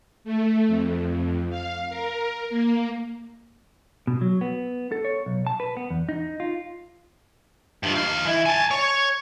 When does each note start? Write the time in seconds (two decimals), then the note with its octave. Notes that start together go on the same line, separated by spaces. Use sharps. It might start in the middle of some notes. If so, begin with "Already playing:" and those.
0.24 A3
0.68 F2
1.50 F5
1.89 A#4
2.50 A#3
4.07 B2
4.21 F#3
4.41 B3
4.92 A4
5.05 C#5
5.26 B1
5.47 A5
5.60 B4
5.77 B3
5.90 E2
6.09 D#4
6.40 F4
7.83 G2 F3
7.96 D#4 F5
8.25 E3 E4
8.46 G#5 A5
8.71 C#5